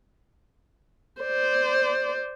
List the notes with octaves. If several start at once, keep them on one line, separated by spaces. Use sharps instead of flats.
C5 D5